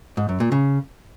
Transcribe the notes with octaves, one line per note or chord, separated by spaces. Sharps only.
G#2
F#2
A#2
C#3